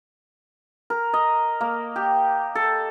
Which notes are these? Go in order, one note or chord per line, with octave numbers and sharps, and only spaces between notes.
A#4
D#5
A#3
G4
A4